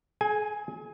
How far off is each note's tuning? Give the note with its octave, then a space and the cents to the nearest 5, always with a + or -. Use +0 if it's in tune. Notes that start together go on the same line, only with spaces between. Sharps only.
G#4 +40 G#5 +0